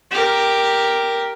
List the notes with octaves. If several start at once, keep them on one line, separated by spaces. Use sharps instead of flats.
G4 A#4